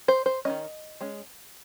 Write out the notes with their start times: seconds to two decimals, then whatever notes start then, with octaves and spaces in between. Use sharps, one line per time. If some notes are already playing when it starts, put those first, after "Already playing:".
0.08 C5
0.26 C5
0.45 D#3 A#3 C#4 D#5
1.01 G#3 C#4